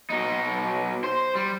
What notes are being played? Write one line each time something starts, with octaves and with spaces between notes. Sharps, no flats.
B2 D#4
C5
G3